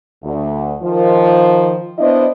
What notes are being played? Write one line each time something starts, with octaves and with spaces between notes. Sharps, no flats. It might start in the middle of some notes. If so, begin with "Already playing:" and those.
D2
D#3 F3
B3 D4 E4 C5 D#5